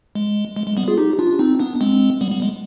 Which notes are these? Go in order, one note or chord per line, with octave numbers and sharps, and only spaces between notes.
G#3
G#3
G#3
G3 B3
F4 G#4
D#4 G4
D4 F4
D4
C4 D#4
B3 D4
G#3 C4
G3 B3
G3 B3
G#3